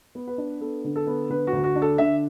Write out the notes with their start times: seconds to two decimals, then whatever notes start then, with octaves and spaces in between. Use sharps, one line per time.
0.15 B3
0.27 B4
0.38 D4
0.61 B3 A4
0.84 D3
0.96 A4
1.07 B3
1.30 D3 B4
1.47 F#4
1.53 D2
1.64 F#4
1.75 D4
1.82 A4
1.98 D3 E5